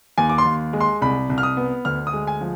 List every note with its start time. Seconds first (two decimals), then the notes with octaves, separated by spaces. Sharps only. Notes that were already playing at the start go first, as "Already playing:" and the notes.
0.18 D#2 G#5
0.29 D6
0.38 C6
0.45 D#2
0.73 G#3
0.81 C6
1.02 C2 B5
1.30 C2
1.38 F6
1.43 D#6
1.57 B3
1.85 D2 F6
2.07 D#6
2.13 G#3
2.27 G#5
2.41 F3